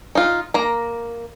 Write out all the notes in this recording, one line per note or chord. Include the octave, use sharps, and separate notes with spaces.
D#4 F4
A#3 A#5